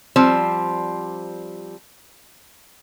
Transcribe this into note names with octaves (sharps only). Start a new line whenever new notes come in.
F3 G3 C4